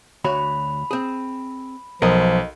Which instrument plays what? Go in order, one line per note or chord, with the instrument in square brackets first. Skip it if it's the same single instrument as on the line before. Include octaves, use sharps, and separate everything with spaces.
[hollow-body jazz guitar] D2 F#4 C#5 [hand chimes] B5
[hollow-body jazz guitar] C4 G#4
[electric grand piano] B1 [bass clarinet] F3 [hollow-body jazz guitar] A#4 D#5